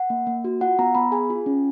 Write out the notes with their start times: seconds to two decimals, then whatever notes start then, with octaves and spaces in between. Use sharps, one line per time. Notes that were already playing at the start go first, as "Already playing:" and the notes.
Already playing: F#5
0.10 A#3
0.27 A#3
0.44 F#4
0.61 F4 F#5
0.79 B3 A#5
0.95 B3 B5
1.12 G#4 G#5
1.30 F4
1.46 C#4